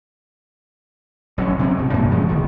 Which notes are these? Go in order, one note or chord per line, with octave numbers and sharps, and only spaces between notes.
A1 F#3 A#3 C#4
C3 C4 C#4
G#1 B2
F#2 A#2 E3 A#3
C#3 F3 G#3 A3
D1 B1 D#3